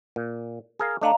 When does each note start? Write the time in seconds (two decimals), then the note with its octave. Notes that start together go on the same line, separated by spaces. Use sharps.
0.16 A#2
0.79 G#4 A#4 F5
1.01 A3 D4 D#5 F5 A#5